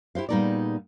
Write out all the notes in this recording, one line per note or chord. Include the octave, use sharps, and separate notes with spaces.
E4 G4 C5 F5
A#2 G3 B3 D#4 G#4 D5